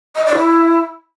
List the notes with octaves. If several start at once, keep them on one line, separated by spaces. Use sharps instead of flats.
D#5
D5
E4